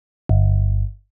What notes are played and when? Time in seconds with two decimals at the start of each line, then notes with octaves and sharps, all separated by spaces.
0.29 G1